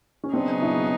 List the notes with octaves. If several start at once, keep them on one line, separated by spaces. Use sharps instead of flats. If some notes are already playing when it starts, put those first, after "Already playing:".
C#4
C#3 F#3 B3 C4 D4 D#4 G#4
D4 E4